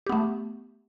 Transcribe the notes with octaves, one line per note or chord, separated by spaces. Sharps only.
A3 B3 G4